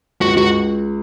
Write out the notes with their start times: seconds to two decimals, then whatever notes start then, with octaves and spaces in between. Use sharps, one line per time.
0.21 C#2 F#4
0.37 C#2 F#4